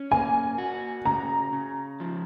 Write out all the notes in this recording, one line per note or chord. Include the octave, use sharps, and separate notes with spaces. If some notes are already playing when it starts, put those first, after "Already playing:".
Already playing: C#4
A#3 G#5
F#4
C#3 A#5
C#3
F3